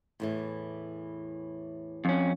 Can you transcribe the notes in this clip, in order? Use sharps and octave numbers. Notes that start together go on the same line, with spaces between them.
E2 A2 E3
F2 C#4